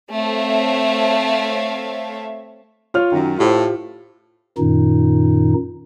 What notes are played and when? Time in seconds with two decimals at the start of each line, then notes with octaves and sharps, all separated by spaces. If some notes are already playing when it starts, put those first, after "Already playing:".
0.12 A3 C4 C#5 E5 F5
2.94 F4 C#5 F6
3.12 F#2 D#3
3.38 A2 F4 G4 C5
4.58 F#2 A#2 D#3 D#4